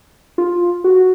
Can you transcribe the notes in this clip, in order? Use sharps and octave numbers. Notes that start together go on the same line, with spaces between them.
F4
F#4